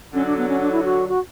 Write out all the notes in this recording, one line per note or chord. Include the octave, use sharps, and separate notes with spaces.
D3 F#3 C#4
D4
B3
C#4
D4
E4
F#4
F#4